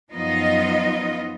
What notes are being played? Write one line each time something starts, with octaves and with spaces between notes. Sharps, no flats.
F#2 F3 B3 D#4 F4 D#5